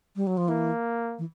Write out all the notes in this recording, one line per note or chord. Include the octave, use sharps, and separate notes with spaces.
G3
F#3
F3
E3 A#3
E3